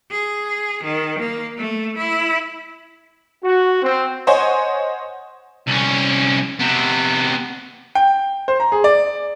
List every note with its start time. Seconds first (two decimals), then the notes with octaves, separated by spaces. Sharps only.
0.11 G#4
0.84 D#3
1.19 A#3
1.58 A3
1.97 E4
3.44 F#4
3.83 C4
4.27 C5 C#5 D#5 F#5 G#5
5.67 C2 C#4
6.61 C3 B3
7.95 G5
8.48 C5
8.60 A#5
8.72 G#4
8.84 D5